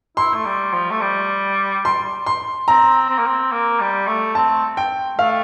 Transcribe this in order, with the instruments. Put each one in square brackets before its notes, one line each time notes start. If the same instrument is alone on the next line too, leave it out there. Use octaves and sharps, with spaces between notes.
[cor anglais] E4 [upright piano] C6
[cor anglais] A3
G3
F3
A3
G3
[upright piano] C6
C6
[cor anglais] C4 [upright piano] A#5
[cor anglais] C4
A#3
C4
A#3
G3
A3
[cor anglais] C4 [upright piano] A5
[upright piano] G5
[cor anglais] A3 [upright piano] F5